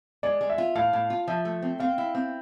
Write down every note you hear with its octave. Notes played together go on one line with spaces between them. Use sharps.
G#3 D5
G#3
E5
F4
A2 F5
A2
F4
F3 E5
A3
C4
C4 F5
E4
C4